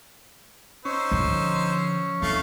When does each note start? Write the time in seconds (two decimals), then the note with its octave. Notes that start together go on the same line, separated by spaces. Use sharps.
0.85 C#4 D#4 C5 E6
1.11 D3 F3
2.22 E3 A3 F5